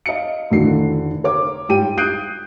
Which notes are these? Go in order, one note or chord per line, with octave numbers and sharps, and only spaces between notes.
D#5 F5 C#7
F1 A2 D3 D#3 F#4 C7
A#4 C#5 D6
G#2 G3 F4 G4 G5 D#7
D#6 F#6 G6 C7 D7 D#7